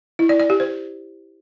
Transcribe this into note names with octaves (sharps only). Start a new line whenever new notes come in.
E4
D5
D5
G4
C5